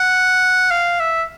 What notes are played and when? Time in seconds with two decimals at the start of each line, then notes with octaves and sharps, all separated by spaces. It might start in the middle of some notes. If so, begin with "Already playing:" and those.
Already playing: F#5
0.71 F5
1.00 E5